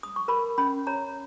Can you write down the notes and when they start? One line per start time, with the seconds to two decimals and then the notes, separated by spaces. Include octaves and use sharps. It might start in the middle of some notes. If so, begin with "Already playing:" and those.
0.03 D#6
0.16 C#6
0.28 A#4 B5
0.58 C#4 B5
0.87 C#5 A#5